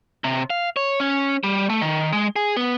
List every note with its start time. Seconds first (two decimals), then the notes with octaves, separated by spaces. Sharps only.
0.24 C3
0.50 F5
0.76 C#5
1.00 C#4
1.44 G3
1.70 A3
1.82 D#3
2.13 G#3
2.36 G#4
2.57 B3